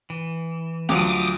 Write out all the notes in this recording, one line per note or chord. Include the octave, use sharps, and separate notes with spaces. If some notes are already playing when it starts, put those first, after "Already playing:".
E3
D2 F3 F#3 G4 D6 D#6